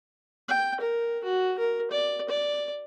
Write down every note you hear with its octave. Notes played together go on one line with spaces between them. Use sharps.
G5
A#4
F#4
A#4
D5
D5